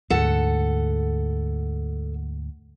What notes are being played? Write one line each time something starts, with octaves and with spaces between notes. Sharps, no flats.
D2 G#2 A4 F#5